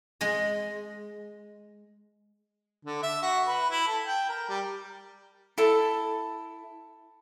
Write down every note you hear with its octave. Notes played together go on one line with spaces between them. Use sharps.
G#3 G#4 D#5
D3
E5
F#4
B4
E4
A4
G5
A#4
G3
E4 A4 A5